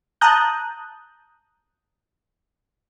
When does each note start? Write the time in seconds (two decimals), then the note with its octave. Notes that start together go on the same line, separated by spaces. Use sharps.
0.21 A5 A#5 D#6 F#6 G6